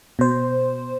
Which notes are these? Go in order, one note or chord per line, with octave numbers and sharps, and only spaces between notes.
B2 C5